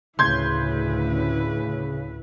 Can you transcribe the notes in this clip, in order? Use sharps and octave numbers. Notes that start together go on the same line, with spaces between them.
D2 A2 C#3 E4 B4 C6 G6 G#6